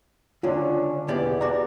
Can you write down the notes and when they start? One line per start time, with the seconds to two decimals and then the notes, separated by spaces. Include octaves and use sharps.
0.43 C#2 D3 C#4 D4 F4
1.08 E2 B2 G4 D5
1.41 F#4 D5 A#5